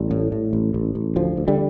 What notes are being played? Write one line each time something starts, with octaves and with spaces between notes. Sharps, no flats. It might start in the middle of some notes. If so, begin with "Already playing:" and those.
Already playing: A1 G3
A2
A2
A1
A1
A1
D2 F3
D2
D3 G3